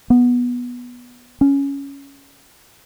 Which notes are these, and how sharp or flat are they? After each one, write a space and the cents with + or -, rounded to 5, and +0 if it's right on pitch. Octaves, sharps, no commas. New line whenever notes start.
B3 -10
C#4 +5